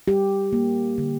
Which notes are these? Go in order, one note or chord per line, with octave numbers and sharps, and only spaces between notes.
G3 G4
A#3
D3